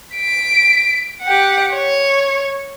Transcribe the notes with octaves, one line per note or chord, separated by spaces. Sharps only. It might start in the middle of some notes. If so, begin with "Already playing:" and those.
B6 D7
G4 F#5
C#5